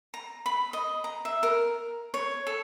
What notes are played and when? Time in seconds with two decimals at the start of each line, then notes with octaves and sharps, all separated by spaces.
0.14 A#5
0.46 B5
0.73 D#5
1.04 A#5
1.25 E5
1.43 A#4
2.14 C#5
2.47 A4